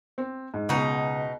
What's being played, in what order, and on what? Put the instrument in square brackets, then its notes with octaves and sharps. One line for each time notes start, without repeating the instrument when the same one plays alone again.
[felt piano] C4
G#2
[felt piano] C#2 B3 [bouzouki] B2 D#4